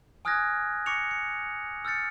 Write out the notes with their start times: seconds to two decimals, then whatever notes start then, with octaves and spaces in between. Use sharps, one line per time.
0.25 G#5 D#6 F6 F#6 G#6 A#6
0.86 C#6 D6 A#6 C#7 F7
1.11 C#7
1.85 E6 F6 G6 A6 C#7